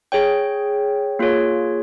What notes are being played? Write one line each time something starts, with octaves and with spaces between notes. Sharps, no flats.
G#4 C#5 G5
A#3 F4 G#4 C#5